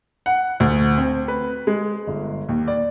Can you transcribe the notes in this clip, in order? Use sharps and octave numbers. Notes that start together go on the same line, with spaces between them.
F#5
D2
C4
B4
G#3
G1
D#2
D5